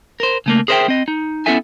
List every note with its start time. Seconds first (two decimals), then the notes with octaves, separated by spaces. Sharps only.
0.20 A#4 C5
0.46 C#3 A3 A#3
0.68 G#4 A#4 C5 D5 E5 G5
0.88 C4 D#5
1.08 D#4
1.46 B3 C#4 E4 A4 E5 G#5